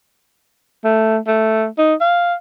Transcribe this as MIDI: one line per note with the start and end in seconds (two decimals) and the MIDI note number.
0.84 1.18 57
1.27 1.66 57
1.78 1.95 63
2.01 2.34 77